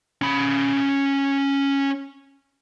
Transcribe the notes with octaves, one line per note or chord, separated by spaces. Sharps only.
C#4 B5